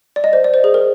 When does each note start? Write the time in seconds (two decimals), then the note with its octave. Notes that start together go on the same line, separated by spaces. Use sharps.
0.16 D5
0.24 D#5
0.33 C5
0.44 D5
0.54 C5
0.64 G#4
0.74 A#4